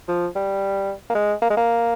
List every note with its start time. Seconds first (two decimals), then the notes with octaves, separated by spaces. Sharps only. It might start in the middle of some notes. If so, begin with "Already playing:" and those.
0.08 F3
0.36 G3
1.10 A#3
1.15 G#3
1.42 A#3
1.50 G#3
1.57 A#3